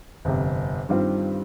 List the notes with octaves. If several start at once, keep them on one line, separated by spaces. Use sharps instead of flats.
G1 F2 C3
G2 D#3 G3 C4 F4